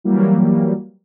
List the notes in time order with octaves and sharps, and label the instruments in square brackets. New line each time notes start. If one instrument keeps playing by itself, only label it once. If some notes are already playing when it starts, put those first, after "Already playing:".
[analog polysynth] E3 F#3 G3 A#3